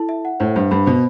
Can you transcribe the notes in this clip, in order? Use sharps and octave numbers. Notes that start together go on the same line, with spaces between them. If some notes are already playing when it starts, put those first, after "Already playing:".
Already playing: E4 A4 A5
E5
F#5
A2 C5
G2 C5
G2 B5
B2 C5